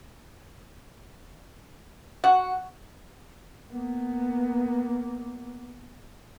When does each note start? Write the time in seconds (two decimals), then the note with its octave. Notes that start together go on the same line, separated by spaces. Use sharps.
2.24 F#4 F#5
3.71 A#3 B3